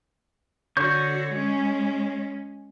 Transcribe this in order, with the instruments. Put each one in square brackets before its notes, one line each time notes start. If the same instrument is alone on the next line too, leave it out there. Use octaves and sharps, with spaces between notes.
[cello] D3 F#4 [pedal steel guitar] C#5 C#6 G6
[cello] G#3 C#4